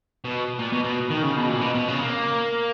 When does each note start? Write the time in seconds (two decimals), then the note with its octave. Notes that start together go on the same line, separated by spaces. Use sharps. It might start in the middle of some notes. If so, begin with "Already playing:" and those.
0.25 B2
0.59 A#2
0.72 B2
0.84 B2
1.10 D#3
1.23 C#3
1.36 B2
1.49 A#2
1.61 B2
1.74 B2
1.88 C#3
2.00 A#3